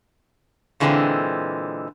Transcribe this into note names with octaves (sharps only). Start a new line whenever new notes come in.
A#2 D3 E3 G#3 A#3 C4